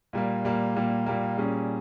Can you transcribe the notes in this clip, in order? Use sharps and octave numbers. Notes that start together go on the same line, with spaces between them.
A#2 G3 A#3
A#2 G3 A#3
A#2 G3 A#3
A#2 G3 A#3
A#2 G3 C#4 G#4